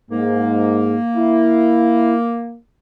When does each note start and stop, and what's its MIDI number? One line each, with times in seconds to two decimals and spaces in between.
0.11 0.98 44
0.11 2.56 58
1.16 2.14 64